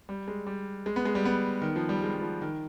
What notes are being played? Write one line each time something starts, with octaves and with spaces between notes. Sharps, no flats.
G3
G#3
G3
G#3
B3
G#3
G3
B3
D#3
F3
G3
G#3
G3
F3
D#3